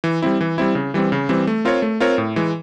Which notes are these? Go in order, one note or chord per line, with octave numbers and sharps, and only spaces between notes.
E3
G3 C4 E4
E3
G3 C4 E4
C#3
E3 G3 C4
C#3
E3 G3 C4
A3
C4 F4 A#4 C#5
A3
C4 F4 A#4 C#5
A2
E3 G#3